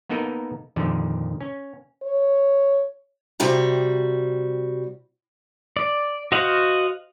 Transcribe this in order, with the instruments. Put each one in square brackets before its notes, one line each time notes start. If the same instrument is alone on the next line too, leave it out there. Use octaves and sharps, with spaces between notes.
[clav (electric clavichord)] A#3 B3 D#4 A4 A#4
F2 A#2 D3 D#3 F3
C#4
[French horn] C#5
[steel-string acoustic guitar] C3 G3 F#4 A#5
[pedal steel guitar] D5
F#4 C5 D#5 F5 F#5